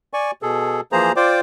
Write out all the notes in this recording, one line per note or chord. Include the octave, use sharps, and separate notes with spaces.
D5 G#5 C#6
B2 G#4 A4
E3 F3 A#3 G#4 C5 A#5
F4 C5 D5 G5 D6